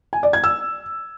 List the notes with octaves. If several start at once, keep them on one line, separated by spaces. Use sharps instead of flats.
G#5
D5
G#6
E6